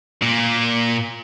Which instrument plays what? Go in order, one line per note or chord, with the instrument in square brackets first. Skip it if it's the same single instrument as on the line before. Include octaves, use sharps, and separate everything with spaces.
[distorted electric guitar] A#2